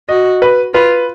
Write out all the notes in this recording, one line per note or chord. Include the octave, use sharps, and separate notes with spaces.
F#4 D#5
B4
F4 B4